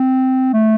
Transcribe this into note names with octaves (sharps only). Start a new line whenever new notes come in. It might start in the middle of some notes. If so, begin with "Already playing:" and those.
Already playing: C4
A3